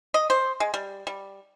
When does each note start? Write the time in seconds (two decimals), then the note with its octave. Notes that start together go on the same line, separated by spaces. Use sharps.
0.14 D#5
0.30 C5
0.60 G#3
0.74 G3
1.07 G3